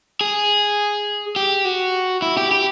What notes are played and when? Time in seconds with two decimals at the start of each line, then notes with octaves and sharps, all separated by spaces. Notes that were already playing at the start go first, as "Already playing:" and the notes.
0.21 G#4
1.36 G4
1.65 F#4
2.22 E4
2.37 G4
2.51 G4